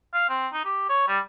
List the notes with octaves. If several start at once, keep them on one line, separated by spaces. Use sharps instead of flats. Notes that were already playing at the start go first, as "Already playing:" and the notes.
F5
C4
D#4
G4
C#5
G3